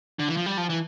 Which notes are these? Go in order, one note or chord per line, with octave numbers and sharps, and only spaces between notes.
D3
E3
F3
G3
F3
E3